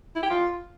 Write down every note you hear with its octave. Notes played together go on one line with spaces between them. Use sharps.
E4
G5
F4